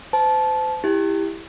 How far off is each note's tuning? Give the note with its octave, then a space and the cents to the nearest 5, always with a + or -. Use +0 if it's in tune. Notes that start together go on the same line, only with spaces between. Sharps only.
C5 -35 A5 -20
E4 +0 G4 +20